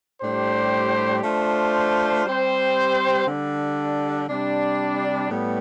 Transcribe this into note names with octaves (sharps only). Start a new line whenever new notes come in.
A2 G3 D4 G4 C5
A3 D4 F4 C5
G3 C4 G4 C5
D3 G3 D4
C3 G3 D4
A2 G3 B3